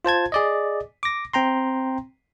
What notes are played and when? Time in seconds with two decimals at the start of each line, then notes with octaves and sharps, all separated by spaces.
0.05 F4 C5 A5 G#6
0.32 G#4 D5 D#5
1.03 D6 A#6
1.34 C4 G5 A#5 C6